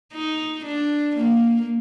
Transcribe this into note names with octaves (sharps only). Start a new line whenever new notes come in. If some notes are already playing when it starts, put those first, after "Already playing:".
D#4
D4
A#3